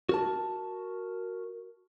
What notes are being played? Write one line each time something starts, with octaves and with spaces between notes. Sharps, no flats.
F#4 A#4 A5